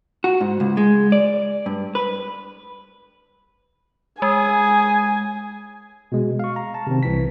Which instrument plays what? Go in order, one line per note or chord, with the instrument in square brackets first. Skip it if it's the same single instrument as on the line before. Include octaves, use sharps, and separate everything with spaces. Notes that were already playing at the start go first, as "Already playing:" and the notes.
[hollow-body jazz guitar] F#4
G#2
C#2
G#3
D5
G2
B4
[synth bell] G#3 [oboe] G#4 [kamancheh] G#5
[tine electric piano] B2 G#3
F5 C#6
A#5
A5
C3 D#3 C4
C2 E3 B6